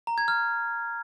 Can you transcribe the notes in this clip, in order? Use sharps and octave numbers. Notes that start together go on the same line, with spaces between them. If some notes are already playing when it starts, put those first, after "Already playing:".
A#5
G#6
F6